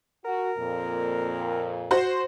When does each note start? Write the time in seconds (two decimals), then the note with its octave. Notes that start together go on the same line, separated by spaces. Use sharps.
0.25 F#4 A#4
0.58 F2 A#2
1.91 F#4 C5 C6